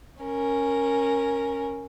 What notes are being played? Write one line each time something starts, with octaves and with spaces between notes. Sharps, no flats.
C#4 A#4